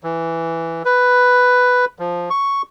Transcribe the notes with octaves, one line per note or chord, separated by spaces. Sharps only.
E3
B4
F3
C#6